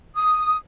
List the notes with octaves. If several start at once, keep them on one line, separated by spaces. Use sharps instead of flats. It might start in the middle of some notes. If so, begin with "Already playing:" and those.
D#6